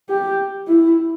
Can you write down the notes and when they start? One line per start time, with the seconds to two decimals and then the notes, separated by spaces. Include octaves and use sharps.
0.09 G4
0.68 E4